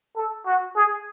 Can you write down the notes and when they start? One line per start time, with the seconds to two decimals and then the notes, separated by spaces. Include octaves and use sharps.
0.16 A4
0.46 F#4
0.76 G#4